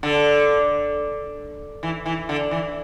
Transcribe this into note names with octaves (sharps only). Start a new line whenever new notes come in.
D3
E3
E3
D3
E3